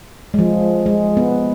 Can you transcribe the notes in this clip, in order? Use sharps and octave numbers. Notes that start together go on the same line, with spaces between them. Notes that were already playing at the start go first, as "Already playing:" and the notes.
G#3
F3
G#3
B3